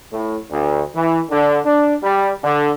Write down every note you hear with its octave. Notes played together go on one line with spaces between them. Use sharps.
A2
D2
E3
D3
D4
G3
D3